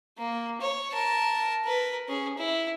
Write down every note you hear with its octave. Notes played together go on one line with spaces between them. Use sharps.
A#3
C#5
A#4 A5
A#4 B4
C#4 G#4
E4